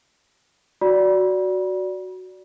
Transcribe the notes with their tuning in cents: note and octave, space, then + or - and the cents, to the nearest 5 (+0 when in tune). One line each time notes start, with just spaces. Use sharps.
F#4 +0 D5 -15 B5 -40